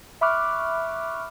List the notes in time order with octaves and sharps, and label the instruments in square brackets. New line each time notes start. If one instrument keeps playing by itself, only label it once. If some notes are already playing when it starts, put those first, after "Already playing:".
[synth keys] E5 B5 C#6 D6 F6 F#6